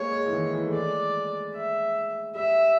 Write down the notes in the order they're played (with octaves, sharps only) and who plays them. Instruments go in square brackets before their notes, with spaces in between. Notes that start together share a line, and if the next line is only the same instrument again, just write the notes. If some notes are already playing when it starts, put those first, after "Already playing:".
Already playing: [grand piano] G#3 A#3 [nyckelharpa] C#5
[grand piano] G#3
E3
D#3
E3
A3
[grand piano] G#3 [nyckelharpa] D5
[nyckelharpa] E5
[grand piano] G3 [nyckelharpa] E5